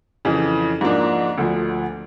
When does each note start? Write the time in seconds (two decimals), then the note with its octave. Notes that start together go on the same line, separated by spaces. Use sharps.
0.25 F2 C#3 E3
0.81 G#2 F3 A#3 D4
1.38 D2 D3 F3